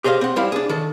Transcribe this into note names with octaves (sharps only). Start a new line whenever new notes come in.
G4 G#4 C5 D#5 F5
C4 F#5
G3 C4 E4 C5 F5
D4 G#4
D#3 A4